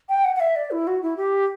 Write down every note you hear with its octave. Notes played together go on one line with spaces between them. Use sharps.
G5
F#5
F#5
E5
D5
E4
F#4
E4
G4